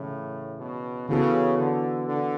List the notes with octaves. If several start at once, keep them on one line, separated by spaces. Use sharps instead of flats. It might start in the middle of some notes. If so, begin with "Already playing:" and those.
Already playing: A2 C#3 E3
B2
C#3 E3 B3 F#4 A4
D3
D3